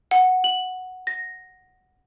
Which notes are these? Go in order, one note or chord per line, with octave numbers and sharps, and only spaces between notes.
F#5
F#7
A#6